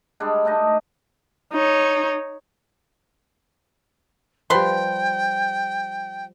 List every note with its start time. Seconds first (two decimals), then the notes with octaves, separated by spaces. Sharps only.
0.20 G3 G#3 D4 G#4
0.45 A3 D4 D#4 D#5
1.53 D#4 C#5
4.50 F3 G3 B4 G5 C6